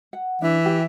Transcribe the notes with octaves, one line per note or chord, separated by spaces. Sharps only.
F#5
E3 D4 E5
G4